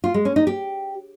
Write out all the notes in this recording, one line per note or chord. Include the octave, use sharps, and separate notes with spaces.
F4
G#3
C#4
D#4
G4